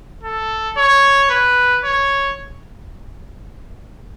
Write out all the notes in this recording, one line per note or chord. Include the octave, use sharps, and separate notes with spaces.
A4
C#5
B4
C#5